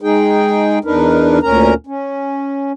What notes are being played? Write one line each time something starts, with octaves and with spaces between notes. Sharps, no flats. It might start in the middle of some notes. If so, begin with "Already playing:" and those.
G#3 D#4 G#4 G5
E2 D4 D#4 A#4 B4
D2 A#2 C#4 A#4 A#5
C#4